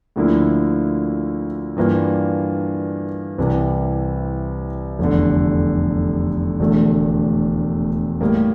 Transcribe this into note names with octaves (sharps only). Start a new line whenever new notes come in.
D2 D3 F3 A#3 E4
G2 E3 A#3 D4 F4
C2 C3 E3
F1 E2 D3
E1 E2 D3 A3
A2 G3 A#3